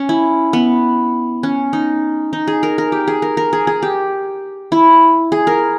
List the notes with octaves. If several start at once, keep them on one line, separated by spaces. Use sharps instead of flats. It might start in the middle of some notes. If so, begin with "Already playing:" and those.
Already playing: C#4
E4
B3
C#4
D#4
D#4
G#4
A#4
A#4
G4
G#4
A#4
A#4
G#4
G#4
G4
E4
G#4
A#4